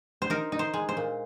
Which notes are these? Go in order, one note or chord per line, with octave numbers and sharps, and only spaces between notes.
C5
D#4 A#4
D#4
C5
G#3
C5
A#2